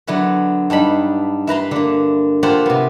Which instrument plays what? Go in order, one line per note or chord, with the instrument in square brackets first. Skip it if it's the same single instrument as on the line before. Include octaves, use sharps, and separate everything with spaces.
[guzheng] D3 F#3 B3 E4 B4
G2 D4 D#4 B5
E4 B4 A#5 C6
D3 A#3
A#3 F4 G4 C5 F#5 A5
C3 B3